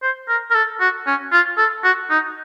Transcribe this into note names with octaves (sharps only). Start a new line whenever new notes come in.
C5
A#4
A#4
A4
F#4
C#4
F4
A4
F#4
D#4